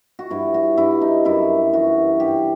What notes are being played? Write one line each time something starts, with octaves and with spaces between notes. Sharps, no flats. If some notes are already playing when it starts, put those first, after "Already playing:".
F#4
G2 E4
F#4
G2 E4
D#4
F#2 E4
E3 F#4
G2 G4